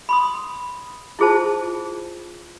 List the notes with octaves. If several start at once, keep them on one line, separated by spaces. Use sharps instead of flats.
B5 C6 D#6
E4 F4 G#4 C5 A5